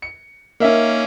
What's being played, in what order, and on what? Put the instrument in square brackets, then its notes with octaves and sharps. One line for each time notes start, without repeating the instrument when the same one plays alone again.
[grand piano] C#7
[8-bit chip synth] A#3 C#4 [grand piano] D#4 A#4 E5